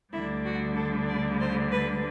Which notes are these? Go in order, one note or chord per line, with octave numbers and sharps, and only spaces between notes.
D2 D3 G3 E4
F#4
A4
D5
C5
B4